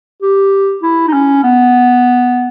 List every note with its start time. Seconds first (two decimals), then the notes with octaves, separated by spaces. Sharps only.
0.22 G4
0.82 E4
1.08 D#4
1.13 C#4
1.43 B3